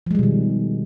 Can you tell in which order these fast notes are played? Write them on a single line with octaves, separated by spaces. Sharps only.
F3 G#3 G3 B2 D#3